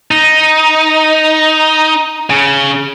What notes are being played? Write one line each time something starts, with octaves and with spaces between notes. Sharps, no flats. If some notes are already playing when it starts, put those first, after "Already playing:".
D#4
C#3